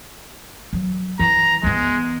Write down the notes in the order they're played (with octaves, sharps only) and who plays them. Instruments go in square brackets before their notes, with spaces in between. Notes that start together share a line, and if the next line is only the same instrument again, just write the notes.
[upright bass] F#3
[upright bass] E3 [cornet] A#5
[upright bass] E3 B3 [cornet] G#3